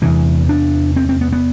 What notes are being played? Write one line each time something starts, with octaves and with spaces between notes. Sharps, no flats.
E2 C3 E3
D4
C4
C4
B3
B3